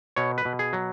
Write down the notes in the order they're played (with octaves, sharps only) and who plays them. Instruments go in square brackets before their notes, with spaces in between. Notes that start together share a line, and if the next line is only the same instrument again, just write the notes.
[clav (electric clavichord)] B2 C#5
B4
B2
G#4
F#3